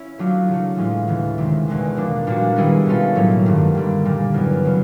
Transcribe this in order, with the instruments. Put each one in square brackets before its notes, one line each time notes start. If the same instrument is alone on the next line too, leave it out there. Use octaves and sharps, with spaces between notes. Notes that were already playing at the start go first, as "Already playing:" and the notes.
Already playing: [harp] C#4 E4
F#3 A3 D4 F4
C#3 F#3 A3
A2 E3 G#3 C#4 F4
D2 C#3 E3
C3 D#3 G#3
E2 B2 G#3
F3 A#3 D4
A#2 G3 A#3 D4 F#4
D#3 G3 B3 E4 G#4
B2 G#3 C#4 F4 A4
A2 F#3 A#3 C#4
G2 D#3 G3
D3 G3 A#3
A#2 G3 A#3
E2 C#3 F#3 B3
C#3 F#3